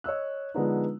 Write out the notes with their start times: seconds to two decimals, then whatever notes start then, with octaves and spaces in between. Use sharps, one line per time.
0.04 C#5 D#5 E6 F#6
0.54 D3 F3 G#3 B3 D4 D#4